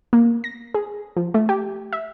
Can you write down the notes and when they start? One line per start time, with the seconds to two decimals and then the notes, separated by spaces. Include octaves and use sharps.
0.13 A#3
0.44 A#6
0.74 G#4
1.17 F3
1.34 A3
1.49 G4
1.93 E5